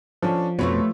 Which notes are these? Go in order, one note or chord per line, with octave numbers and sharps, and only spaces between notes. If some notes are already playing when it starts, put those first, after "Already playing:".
F3 C#4 D4 A4
F2 B2 G3 A3 F4 B4 C#5